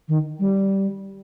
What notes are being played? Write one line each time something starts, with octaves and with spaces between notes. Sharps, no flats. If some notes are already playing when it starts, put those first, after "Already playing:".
D#3
G3